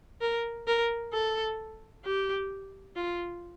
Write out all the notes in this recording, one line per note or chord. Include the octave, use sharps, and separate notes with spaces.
A#4
A#4
A4
G4
F4